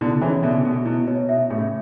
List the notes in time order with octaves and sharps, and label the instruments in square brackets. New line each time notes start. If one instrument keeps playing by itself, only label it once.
[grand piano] B2 D3 [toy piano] E4
[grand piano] C#3 E3 [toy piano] C#5
[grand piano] B2 D3 [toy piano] E5
[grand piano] B2 [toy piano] G#4
[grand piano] B2 [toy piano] E4
[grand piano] B2 [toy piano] C#5
[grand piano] B2 [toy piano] E5
[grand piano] A2 C#3 [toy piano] G#4